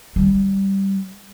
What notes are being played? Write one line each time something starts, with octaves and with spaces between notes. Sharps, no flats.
G3